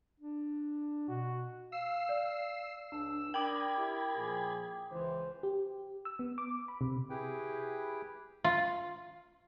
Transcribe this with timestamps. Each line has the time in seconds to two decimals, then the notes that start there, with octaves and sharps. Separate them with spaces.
0.20 D4
1.09 B2 F#4
1.72 F5 E6 C7
2.09 D5
2.92 C#2 D4 E6
3.34 D4 A#4 G5 B5 D6 D#6 G#6
3.78 E4 G4
4.17 A#2 F3 G#4
4.91 C#2 E3 C5
5.43 G4
6.05 E6
6.19 B3
6.38 D6
6.68 B5
6.81 C3
7.10 E4 G4 G#4 B4 G5
8.44 F4